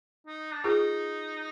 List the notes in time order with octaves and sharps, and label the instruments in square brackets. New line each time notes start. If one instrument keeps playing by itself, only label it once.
[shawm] D#4
D4
[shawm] D#4 [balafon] F4 G#4